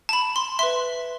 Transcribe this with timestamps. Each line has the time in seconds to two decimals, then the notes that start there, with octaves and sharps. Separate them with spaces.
0.09 A5
0.13 B5
0.36 C6
0.59 B4 E5 C6